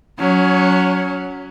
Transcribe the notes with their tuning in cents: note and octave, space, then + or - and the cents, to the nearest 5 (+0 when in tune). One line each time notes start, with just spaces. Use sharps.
F#3 -5 C#4 +20